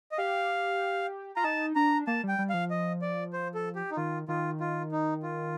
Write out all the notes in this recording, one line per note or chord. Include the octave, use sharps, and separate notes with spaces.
D#5
G4 F5
F4 A#5
D#4 A5
D4 A#5
A#3 A5
G3 G5
G3
F3 F5
D#5
D5
C5
A4
G4
D#4
D#3 F4
D#3 F4
F4
D#4
F4